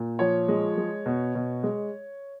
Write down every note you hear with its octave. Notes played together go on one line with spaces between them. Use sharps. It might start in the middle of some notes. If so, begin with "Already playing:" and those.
Already playing: A#2
F3 C#5
G#3
G#3
B2
B2
G#3